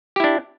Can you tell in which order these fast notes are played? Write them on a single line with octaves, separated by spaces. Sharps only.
G4 E4 D4